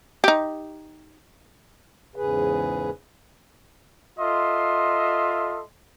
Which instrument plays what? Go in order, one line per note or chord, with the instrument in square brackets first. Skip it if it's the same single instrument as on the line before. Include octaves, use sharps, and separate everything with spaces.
[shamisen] D#4 G4
[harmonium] E2 G#2 C#3 G#4 B4
[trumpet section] F4 A4 D#5 E5 C6